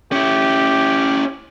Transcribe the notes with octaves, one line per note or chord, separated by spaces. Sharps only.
C#4 E4 G4